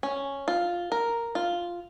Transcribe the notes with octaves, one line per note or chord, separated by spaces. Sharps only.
C#4
F4
A#4
F4